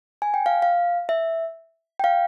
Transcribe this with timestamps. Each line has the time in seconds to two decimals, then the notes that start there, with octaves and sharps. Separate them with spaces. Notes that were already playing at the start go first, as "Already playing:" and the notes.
0.22 G#5
0.34 G5
0.46 F5
0.62 F5
1.09 E5
2.00 G5
2.04 F5